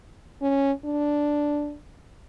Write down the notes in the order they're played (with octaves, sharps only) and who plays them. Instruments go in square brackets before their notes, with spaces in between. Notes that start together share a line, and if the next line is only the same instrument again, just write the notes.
[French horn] C#4
D4